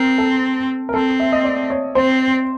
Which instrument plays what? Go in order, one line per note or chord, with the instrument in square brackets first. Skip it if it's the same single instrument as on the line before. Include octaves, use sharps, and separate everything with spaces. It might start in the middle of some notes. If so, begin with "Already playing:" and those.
Already playing: [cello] C4 [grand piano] A#4
[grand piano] A4
A#4
[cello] C4 [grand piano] A4
[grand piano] E5
D#5
D5
C#5
[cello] C4 [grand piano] C5